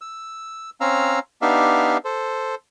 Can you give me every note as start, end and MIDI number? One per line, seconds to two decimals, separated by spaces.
0.01 0.70 88
0.81 1.19 60
0.81 1.19 61
0.81 1.19 77
0.81 1.19 82
0.81 1.19 88
1.42 1.97 59
1.42 1.97 62
1.42 1.97 63
1.42 1.97 67
1.42 1.97 76
1.42 1.97 77
2.05 2.55 69
2.05 2.55 72